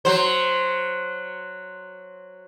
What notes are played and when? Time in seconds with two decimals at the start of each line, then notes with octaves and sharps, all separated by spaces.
0.05 F#3 C5